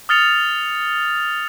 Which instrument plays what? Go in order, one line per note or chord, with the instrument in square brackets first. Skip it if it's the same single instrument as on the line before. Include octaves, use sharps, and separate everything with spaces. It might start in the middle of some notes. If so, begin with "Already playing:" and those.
[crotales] D#6 F6 A6 C#7 F7